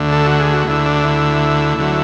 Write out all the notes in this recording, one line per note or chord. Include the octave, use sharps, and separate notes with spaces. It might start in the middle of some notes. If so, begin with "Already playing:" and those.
Already playing: D2 D3 A3
A4
F#4
G#4
F#4
D2 D3 A3 E4
D4
E4
D2 D3 F#3 A3